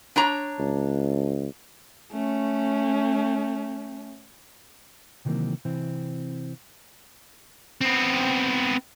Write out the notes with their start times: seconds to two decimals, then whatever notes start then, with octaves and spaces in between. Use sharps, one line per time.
0.16 D4 C#5 A#5
0.59 C#2
2.13 A3 C#4
5.25 C3 D#3 E3 F#3 A#3 C4
5.65 C3 E3 C4
7.81 B3 C4